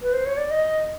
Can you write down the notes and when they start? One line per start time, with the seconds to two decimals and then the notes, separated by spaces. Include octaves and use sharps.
0.02 B4
0.13 C5
0.26 C#5
0.37 D5
0.51 D#5